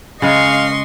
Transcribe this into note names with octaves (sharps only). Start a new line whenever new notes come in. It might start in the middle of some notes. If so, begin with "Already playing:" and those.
C#3 G#3 D#5 F5 C6 C#6